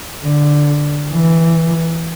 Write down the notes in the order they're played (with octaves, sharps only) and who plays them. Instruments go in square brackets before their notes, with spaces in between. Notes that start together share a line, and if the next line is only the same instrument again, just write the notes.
[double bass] D3
E3